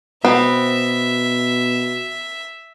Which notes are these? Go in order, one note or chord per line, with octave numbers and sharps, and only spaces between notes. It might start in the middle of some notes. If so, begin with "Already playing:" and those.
B2 B3 C4 E5